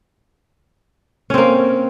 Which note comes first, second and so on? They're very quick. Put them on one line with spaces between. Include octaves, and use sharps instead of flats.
C#4 C4 A#3